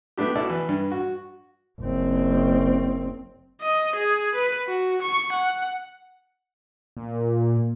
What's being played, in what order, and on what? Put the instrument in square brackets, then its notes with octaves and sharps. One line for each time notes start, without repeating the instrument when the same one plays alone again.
[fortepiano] A3 B3 D4 G4
B2 E4 A4 D5
E3
G2
F#4
[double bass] F#1 C4
[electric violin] D#5
G#4
B4
F#4
C#6
F#5
[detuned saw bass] A#2